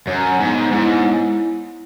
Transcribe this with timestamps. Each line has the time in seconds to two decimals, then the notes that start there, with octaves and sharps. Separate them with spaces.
0.07 F#2 C#5
0.40 G#2 B3
0.72 G#2 E4